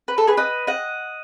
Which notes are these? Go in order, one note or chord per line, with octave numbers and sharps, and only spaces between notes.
B4
A4
G#4 B4
B4 D#5
D#5 F#5